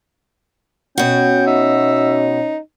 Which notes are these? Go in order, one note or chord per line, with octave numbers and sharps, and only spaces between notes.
B2 C#4 F#4 G5
D#4 E5